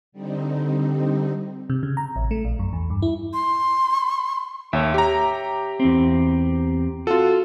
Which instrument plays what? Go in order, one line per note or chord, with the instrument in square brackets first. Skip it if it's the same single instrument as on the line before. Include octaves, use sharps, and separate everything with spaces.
[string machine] D3 G3 C4 D#4
[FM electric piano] C3
C#3
A#5
A1
A3
A#1
F#2
E2
G2
E4
[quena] C6
[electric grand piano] D#2 [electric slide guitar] C#5 E5
[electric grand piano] G4 A#5
[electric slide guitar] E2 C4
[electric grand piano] F4 A4 [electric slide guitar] F#4